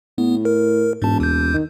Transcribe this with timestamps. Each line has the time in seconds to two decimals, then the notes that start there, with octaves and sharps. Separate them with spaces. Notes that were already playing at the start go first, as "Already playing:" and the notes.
0.18 A2 B3
0.45 A#4
1.02 E1 G#2 A5
1.20 D#2 G6
1.53 D#3